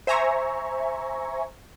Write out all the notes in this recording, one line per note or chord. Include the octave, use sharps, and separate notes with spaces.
C5 E5 G#5 A#5 C#6